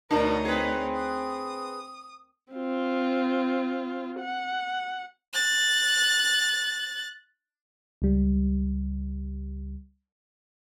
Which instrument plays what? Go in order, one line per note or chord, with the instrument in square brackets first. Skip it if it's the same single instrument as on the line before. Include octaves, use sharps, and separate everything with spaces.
[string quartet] D2 D#4 C#5 [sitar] B2 D4 [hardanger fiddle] A#4
[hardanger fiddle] C4 [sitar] G#4 B4
[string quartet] D#6
[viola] C4 F4
F#5
[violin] F#6 A6
[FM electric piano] C#2 G3